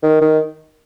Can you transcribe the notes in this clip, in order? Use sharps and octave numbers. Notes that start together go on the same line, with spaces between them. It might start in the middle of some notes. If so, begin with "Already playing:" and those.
D#3
D#3